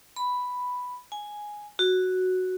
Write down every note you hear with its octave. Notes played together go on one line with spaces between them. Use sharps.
B5
G#5
F#4